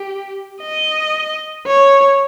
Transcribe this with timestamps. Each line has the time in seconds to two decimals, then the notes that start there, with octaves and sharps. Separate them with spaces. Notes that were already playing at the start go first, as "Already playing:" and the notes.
Already playing: G4
0.62 D#5
1.67 C#5